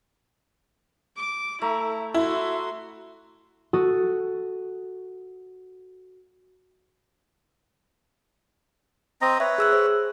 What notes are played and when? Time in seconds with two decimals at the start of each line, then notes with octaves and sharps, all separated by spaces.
1.17 D6
1.61 A3 E4 E5 A#5
2.14 E4 F#4 C6
3.73 F#4 A4 D#6
9.21 C4 D#5 A#5
9.40 B4 C#5 E5
9.58 G#4 E6 F#6
9.73 C5